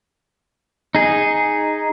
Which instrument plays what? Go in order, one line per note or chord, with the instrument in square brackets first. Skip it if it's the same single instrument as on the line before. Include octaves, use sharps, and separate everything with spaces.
[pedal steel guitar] D#4 G#4